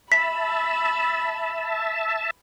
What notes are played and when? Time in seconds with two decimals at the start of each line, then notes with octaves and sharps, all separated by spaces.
0.12 E5 A5 B5 B6